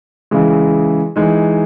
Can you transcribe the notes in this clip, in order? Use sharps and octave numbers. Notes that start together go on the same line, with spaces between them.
C#3 E3 G#3
E3 G#3 D#4